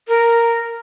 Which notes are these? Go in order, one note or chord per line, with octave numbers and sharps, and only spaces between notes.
A#4